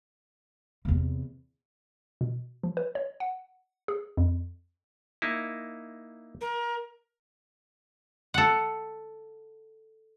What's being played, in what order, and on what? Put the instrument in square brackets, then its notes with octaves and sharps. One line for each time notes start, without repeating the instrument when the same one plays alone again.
[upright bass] E2 C3
[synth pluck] B2
F3
B4
C#5
F#5
G#4
F2
[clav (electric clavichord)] A#3 D#4 E4
[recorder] A#4
[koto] A4 F#5